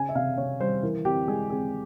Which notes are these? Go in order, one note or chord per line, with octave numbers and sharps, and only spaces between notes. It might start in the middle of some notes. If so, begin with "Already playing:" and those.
Already playing: C#3 C#4 G#5
E5
C3 F5
C3 C#5
G3 C5
E3 A#4
C4 G4
G#3 G#4
C4 G#4